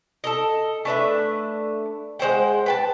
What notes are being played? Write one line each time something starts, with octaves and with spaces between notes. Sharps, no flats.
A4 A#4 D#5
A3 D4 B4 E5
G#3 C5 F#5 G5
B4 G5 A5